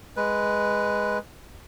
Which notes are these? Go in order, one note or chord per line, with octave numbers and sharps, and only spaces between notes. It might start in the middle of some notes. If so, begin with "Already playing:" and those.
G#3 B4